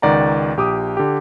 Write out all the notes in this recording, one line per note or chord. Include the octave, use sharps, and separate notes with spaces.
C#2 D#3 D5 F#5 A#5
A#1 G4 D6 D#6
D3 G4